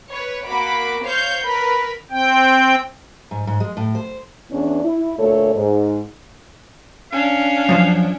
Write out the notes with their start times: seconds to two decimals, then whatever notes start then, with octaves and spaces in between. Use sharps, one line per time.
0.11 B4 C#5
0.45 A#3 F#4 B5 D6
1.03 C5 C#5 F5 G6
1.42 A#4 B4 B5
2.11 C4 G5
3.31 G#2
3.47 G#2
3.60 G#3
3.77 A2
3.95 C5
4.50 E2 E3 B3 C#4 D4
4.84 E4
5.18 D2 A#2 A3 A4 C#5
5.55 G#2
7.12 C#4 D4 F5
7.69 F#2 F3 C5